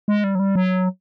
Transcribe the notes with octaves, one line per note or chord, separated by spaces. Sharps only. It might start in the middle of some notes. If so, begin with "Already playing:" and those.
G#3
G3
F#3
G3
F#3